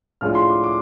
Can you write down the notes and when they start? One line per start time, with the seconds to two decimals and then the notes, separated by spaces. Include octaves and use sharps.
0.21 A2 F3 G#3 D4 F6
0.35 C6
0.49 D6
0.64 D6